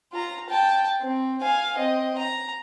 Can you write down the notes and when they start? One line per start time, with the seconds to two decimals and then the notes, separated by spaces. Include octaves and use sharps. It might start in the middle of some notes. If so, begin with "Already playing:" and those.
0.12 F4 A#5
0.49 G5 A5
1.01 C4
1.41 F5 G#5
1.76 C4 D#5
2.18 A#5